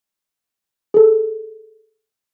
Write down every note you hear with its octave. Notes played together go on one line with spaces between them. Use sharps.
G#4 A4